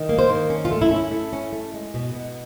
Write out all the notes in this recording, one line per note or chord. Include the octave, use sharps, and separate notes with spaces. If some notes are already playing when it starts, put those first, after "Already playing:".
Already playing: D#3
A#3
C5
D#3
C#4
F4
A3
E4
C#4
E4
A3
C#4
A3
G#3
B2
B2